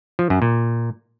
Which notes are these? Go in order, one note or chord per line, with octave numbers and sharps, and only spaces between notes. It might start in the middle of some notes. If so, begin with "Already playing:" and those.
F3
F#2
A#2